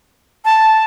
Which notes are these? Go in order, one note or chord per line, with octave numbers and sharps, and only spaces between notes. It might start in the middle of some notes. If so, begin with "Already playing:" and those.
A5